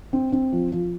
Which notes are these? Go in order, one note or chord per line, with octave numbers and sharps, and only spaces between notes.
C4
C4
F3
F3